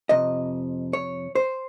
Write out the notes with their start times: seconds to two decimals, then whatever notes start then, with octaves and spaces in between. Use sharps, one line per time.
0.09 F2 C3 D#5
0.93 C#5
1.35 C5